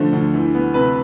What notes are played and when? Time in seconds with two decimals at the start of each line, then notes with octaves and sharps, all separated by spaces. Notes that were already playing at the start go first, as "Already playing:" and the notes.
Already playing: D3 F3 A3 C5
0.13 D2
0.34 E3
0.54 B3
0.74 C3 B4